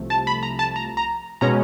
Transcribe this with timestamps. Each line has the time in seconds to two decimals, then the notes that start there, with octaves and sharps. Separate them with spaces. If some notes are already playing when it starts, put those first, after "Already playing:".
Already playing: C2 C3 F3 A3
0.10 A5
0.27 B5
0.43 A#5
0.59 A5
0.76 A#5
0.97 A#5
1.41 B2 G#3 C#4 A#5